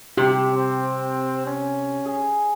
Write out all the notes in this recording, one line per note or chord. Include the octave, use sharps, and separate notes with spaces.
C3 G4
C4
C#4
G#4